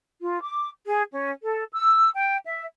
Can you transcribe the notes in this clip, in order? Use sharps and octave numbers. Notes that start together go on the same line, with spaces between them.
F4
D6
G#4
C#4
A4
E6
G5
E5